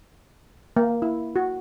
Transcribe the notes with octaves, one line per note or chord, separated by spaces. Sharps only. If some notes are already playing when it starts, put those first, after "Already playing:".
A#3
E4
F#4